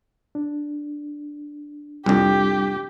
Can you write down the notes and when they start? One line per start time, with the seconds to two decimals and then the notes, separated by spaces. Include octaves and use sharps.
0.35 D4
2.06 C2 F2 G3 D4 G4